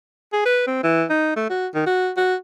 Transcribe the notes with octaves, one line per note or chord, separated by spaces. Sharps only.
G#4
B4
C4
E3
D#4
A3
F#4
D#3
F#4
F#4